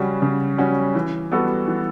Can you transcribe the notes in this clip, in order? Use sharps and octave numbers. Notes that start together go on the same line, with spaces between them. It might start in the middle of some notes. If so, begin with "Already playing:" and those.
Already playing: C#3 G3 C#4 F#4
C#3
G3 C#4 F#4
E3
G3 B3 F#4 A4
E3